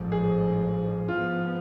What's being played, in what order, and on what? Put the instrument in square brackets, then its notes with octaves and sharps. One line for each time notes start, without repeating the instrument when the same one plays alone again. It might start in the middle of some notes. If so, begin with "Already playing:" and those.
Already playing: [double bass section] A1 G#2 F3
[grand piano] G#4
[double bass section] G#2 F3 B3 [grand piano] F4